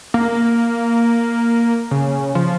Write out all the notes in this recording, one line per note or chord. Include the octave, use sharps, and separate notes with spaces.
A#3
C#3
F3